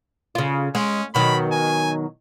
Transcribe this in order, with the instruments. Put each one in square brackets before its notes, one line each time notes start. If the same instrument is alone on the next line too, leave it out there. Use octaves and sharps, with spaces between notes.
[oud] C#3 F4
[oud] G#3 [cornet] C#4
[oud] B2 D#3 F#3 [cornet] B5
[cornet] G#5